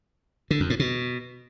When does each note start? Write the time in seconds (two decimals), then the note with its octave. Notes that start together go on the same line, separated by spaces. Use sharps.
0.51 D3
0.60 F2
0.70 A2
0.79 B2